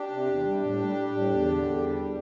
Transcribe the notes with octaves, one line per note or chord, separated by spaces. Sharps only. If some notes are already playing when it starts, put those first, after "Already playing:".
Already playing: D4 G4
C3
E2
G3
A2
G3
G3
A2
E2
D3
E2
G3